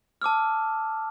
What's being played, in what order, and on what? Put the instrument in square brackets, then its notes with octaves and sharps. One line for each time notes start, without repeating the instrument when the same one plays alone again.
[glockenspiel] A5 D6 E6 F6